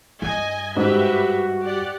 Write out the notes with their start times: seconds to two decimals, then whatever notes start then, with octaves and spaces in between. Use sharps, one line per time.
0.22 G2 D#5 G#5
0.77 G#2 F#4 G4 B4 E5
1.63 G4 D5 F#5